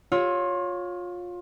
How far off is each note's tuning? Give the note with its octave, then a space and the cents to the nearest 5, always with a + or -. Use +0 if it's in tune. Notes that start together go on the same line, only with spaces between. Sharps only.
F4 +25 C#5 +0 E6 +0